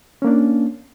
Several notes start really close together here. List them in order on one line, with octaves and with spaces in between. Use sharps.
C#4 A#3 D4